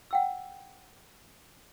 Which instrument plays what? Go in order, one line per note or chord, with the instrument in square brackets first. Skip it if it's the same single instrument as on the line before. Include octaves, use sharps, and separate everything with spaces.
[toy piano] F#5 G5 E6